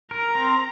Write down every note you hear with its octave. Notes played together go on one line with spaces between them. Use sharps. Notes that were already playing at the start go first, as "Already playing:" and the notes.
A#4 A#5
C4